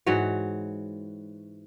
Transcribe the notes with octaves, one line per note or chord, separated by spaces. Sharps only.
G#2 E3 F#4 C#5